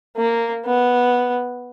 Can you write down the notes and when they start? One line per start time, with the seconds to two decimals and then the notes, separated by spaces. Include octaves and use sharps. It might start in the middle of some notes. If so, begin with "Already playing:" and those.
0.17 A#3
0.65 B3